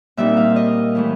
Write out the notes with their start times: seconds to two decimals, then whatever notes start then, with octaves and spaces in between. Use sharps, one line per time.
0.17 A#2 G3 C4 D#4 E5
0.37 F5
0.56 D#5
0.95 A2 E3 A3